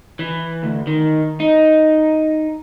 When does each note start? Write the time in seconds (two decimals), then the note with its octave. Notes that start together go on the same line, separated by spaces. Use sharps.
0.19 E3
0.63 D2
0.87 D#3
1.40 D#4